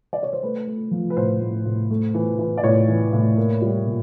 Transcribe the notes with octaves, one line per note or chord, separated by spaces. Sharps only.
D5
C#5
C5
A3 B4
A3
F3
B4
A2 C5
A2
A2
A3
E3
E3
D5
A2 C#5
E3
A2
A#3
G3
A#2